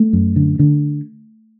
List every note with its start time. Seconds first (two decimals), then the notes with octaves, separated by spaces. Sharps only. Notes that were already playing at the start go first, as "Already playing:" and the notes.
Already playing: A3
0.13 F#2
0.36 D3
0.59 D3